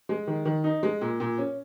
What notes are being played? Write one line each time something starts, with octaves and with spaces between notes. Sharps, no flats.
G#3
D#3
D#3
D#4
G#3
A#2
A#2
C#4